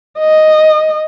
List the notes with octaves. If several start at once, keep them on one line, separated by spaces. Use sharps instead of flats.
D#5